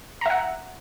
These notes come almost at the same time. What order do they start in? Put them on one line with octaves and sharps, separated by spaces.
A#5 E5 F#5